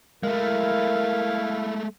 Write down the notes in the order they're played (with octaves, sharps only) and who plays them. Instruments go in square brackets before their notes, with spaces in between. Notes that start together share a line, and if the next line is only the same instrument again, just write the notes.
[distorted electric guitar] G#3 A3 [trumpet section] E4 [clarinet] A#4 [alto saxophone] F5